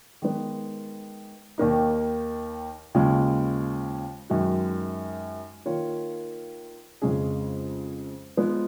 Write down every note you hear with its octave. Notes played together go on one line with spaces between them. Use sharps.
D#3 G#3 B3
D#2 D#3 A#3 D#4
D#2 C#3 F3 G#3
F#2 D#3 G#3 D#4 F#4
D#3 A#3 F4 A#4 C#5
F2 C#3 G#3 C#4 G#4
F3 G#3 B3